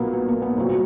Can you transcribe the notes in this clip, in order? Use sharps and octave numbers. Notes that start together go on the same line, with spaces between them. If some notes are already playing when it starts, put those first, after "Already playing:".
Already playing: B1 A#2 F#3 A#3 B3
B3
A#3
B3
C2 A#2 F#3 C4